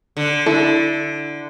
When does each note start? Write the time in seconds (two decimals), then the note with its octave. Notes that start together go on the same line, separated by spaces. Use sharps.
0.17 D3
0.46 D3 E4 A4